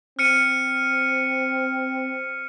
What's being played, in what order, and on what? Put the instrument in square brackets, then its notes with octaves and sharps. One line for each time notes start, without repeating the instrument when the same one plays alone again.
[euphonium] C4 [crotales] F6 C#7 D#7